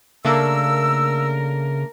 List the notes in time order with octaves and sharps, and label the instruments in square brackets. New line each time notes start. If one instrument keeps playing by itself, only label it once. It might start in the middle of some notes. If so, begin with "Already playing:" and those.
[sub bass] C#3 [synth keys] A3 A#3 D4 [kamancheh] A#4 [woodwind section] E6